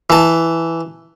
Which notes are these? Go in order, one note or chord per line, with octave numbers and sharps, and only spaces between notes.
E3 A5